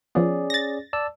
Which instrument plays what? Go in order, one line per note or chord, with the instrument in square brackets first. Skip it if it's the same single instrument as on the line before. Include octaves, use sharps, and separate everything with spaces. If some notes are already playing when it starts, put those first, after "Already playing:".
[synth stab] F3 B3 [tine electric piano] C#4 G#4 D5
[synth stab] A6 A#6
[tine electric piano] D5 A5 E6